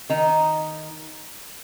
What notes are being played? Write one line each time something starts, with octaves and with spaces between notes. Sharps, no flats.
D#3 D#4